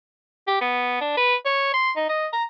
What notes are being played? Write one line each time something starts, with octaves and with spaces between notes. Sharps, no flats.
G4
B3
D4
B4
C#5
C6
D#4
D#5
A#5